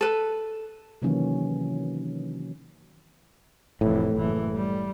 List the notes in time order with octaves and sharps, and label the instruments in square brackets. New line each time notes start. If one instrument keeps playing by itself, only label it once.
[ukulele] A4 B4
[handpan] C3 D#3 E3 F#3 A#3 C#4
[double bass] F1 E3 [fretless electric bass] A2
[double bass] F#1 E3
G3